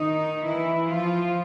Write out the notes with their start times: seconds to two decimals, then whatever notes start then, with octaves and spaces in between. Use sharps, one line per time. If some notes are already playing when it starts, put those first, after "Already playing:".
Already playing: D#3 D#4
0.47 E3 E4
0.90 F3 F4